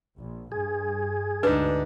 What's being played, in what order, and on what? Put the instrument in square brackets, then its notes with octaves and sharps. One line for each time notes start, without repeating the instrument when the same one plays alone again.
[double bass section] A#1
[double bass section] G2 [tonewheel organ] G#4
[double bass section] D2 [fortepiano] G#2 D4 [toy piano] B4